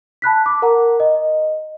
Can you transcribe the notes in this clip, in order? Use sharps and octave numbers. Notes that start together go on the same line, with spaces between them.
A5 B5 F#6 B6
D6
A#4 F#5 A#5
D#5